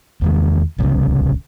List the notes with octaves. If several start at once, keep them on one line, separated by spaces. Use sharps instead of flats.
E2 D#3 G#3
D1 C2 C#3